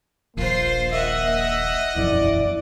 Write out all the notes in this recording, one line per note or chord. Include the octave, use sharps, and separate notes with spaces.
D#1 A#1 A#3 F4 C5
D#5 E5 F#5
E5
E1 A#1 F#2 E4 D5